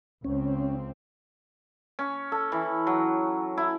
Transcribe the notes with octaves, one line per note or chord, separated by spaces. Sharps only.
C#2 C4 C#4
C#4
A4
E3
F#3
E4